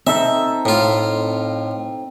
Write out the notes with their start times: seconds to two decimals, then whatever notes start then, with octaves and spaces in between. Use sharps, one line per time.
0.07 C4 D#4 A4 E5
0.65 A2 F4